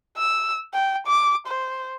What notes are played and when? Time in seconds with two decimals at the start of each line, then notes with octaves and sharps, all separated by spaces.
0.17 E6
0.74 G5
1.07 D6
1.47 C5